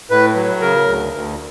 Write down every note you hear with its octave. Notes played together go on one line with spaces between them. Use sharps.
A2 B4
F#3
C#3 A#4
D2
D2